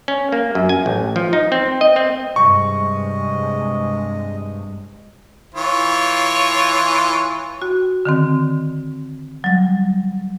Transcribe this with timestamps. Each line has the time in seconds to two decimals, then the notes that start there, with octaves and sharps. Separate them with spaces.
0.08 C#4
0.32 A#3
0.55 F#2
0.69 G#5
0.86 A1
1.16 F3
1.33 D#4
1.52 C4
1.81 D#5
1.96 C4
2.36 G2 C3 G#3 D#5 C#6
5.55 E3 F4 C#5
7.62 F#4
8.05 D3 D#3 C4
9.44 F#3 G3